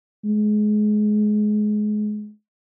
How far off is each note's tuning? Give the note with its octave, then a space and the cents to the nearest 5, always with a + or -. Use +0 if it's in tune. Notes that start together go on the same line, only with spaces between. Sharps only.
G#3 +25